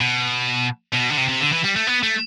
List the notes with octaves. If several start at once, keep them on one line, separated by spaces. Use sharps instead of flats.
B2
B2
D3
C3
C3
D3
E3
G3
A3
B3
A3